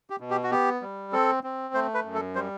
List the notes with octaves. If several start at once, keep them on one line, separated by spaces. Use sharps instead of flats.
G4
B2
G4
F#4
B3 G4
G3
C4 A4
C4
A3 C5
B4
F#2
A4
G3 C5